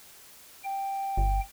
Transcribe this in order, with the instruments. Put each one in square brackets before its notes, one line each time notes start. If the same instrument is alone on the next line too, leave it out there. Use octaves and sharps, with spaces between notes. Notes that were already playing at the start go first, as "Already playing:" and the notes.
[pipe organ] G5
[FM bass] G1